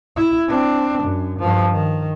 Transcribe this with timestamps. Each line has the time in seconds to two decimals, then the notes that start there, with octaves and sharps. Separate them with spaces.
0.16 E4
0.48 C4 D4
1.03 F#2
1.39 G2 F3
1.71 D#3